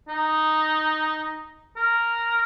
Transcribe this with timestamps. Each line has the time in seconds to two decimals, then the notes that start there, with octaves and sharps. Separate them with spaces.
0.08 D#4
1.77 A#4